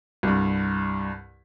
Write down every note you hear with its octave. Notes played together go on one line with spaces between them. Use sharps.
C2 G2